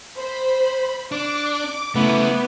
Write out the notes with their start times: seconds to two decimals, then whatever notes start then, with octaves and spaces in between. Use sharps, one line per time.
0.17 C5 B5
1.12 D4 D6
1.95 C#3 A3 B3 E4